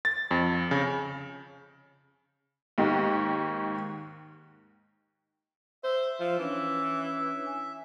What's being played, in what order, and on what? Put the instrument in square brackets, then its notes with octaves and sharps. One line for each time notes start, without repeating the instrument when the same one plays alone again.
[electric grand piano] A6
F2
C#3
[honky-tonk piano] D#2 G#2 D#3
[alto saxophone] C5 [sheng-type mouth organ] E5
[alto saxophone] F3
[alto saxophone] E3 [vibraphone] C#4 D4 C#5
[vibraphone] G#5